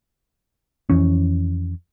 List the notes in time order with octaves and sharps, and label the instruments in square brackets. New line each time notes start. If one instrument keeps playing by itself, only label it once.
[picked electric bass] F2 E3 C#4